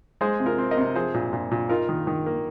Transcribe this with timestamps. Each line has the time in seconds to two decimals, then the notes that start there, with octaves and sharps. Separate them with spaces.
0.21 G#3 G#4 C5
0.40 C3
0.46 F4 A#4
0.58 C4
0.71 A#4 D#5
0.77 C3
0.95 F3 G#4 C5
1.14 A#2
1.33 A#2
1.51 A#2
1.69 D#4 F4 A#4
1.89 D#3
2.07 D#3
2.26 A#3